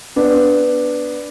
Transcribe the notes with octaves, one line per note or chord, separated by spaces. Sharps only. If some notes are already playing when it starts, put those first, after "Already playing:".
B3 D4